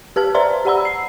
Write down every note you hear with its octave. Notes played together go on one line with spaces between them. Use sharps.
G4 B4 A5 F6
B4 C5 D5 E5 A#5 C6
G4 D5 F#5 A#5 B5 E6
C7